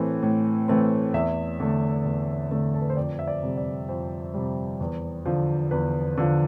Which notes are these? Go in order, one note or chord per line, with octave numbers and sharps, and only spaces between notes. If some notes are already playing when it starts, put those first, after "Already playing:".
Already playing: A2 E3 A3 C4
A2
E3 A3 C4
E2 E5
D3 A3
E2
D3 A3
A4
B4
C5
F2 D5
E5
D5
C3 G3
D5
F2 C5
C3 G3
E2
D3 F3
E2 B4
D3 F3